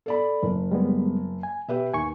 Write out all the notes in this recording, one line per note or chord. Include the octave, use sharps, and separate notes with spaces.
A4 D5 B5
F#1
G3 G#3 B3
G#5
B2 G4 B4 E5
D#2 G#5 C#6